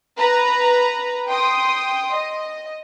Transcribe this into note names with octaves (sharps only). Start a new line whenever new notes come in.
B4 A#5
G5 C6 D#6
D#5